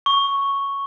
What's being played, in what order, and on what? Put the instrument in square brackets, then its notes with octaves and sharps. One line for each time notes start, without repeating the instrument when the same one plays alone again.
[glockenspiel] C#6